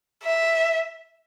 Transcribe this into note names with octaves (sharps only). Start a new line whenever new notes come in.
E5